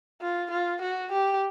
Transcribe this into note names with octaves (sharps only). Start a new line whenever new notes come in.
F4
F4
F#4
G4